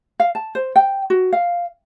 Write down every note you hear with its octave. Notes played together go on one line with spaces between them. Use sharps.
F5
A5
C5
G5
F#4
F5